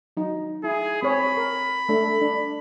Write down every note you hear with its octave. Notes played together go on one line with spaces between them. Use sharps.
F#3 D#4
E4 G#4
C4 G#4 C#5 B5
A#4
A3 D4 A4
D4